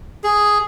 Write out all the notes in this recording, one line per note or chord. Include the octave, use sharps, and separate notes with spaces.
G#4